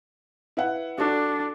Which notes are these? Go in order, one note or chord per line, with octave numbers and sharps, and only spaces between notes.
E4 B4 F#5
D4 F#4 A4 D5